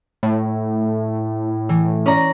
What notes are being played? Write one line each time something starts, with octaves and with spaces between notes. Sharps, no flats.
A2
E3
C#4 D5 A#5